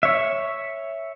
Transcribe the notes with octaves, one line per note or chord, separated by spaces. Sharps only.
C#5 E5